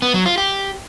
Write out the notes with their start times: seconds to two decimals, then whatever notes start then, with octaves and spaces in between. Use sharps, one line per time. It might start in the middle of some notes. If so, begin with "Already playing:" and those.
0.02 B3
0.14 F#3
0.26 F4
0.38 G4